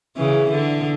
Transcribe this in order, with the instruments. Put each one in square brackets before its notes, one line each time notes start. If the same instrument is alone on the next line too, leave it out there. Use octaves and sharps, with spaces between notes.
[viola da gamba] C#3 E3
D3